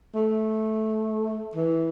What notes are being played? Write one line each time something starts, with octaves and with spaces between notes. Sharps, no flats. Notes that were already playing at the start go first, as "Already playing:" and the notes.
A3
E3